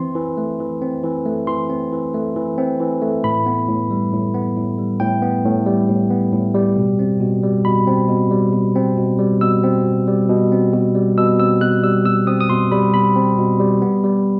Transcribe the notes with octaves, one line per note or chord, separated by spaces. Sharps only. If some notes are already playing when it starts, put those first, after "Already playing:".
Already playing: E3 C4 C6
E3
A3
E3
C4
E3
A3
E3 C6
C4
E3
A3
E3
C4
E3
A3
A2 B5
B3
A2
G3
A2
B3
A2
G3
A2 G5
B3
A2
G3
A2
B3
A2
G3
B2
C4
B2
G3
B2 B5
C4
B2
G3
B2
C4
B2
G3
B2 E6
C4
B2
G3
B2
C4
B2
G3
B2 E6
C4 E6
B2 F#6
G3 E6
B2 E6
C4 D#6
D#6
B2 C6
G3 B5
B2 B5
C4
B2
G3
B3
G3